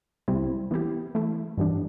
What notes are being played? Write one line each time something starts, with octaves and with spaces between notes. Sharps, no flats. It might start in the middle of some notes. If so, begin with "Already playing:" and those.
C2 C3 G3 C4 E4
E3 B3 E4 G4
E3 A3 E4
G2 E3 G3 D4